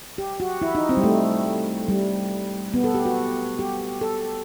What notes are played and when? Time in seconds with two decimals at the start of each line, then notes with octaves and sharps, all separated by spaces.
0.18 G4
0.40 F#4
0.62 E4
0.75 D#4
0.89 C4
0.97 G3
1.04 A3
1.89 G3
2.74 B3
2.84 A4
2.95 G4
3.05 F#4
3.59 G4
4.01 A4